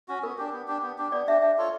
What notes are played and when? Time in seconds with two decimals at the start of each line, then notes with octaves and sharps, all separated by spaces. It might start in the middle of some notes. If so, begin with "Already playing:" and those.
0.08 C#4 F#4
0.23 B3 A#4
0.38 D4 G4
0.52 B3
0.68 D4 G4
0.82 B3
0.98 D4 G4
1.12 B3 D5
1.27 D4 G4 E5
1.42 D4 E5
1.58 F4 A4 C#5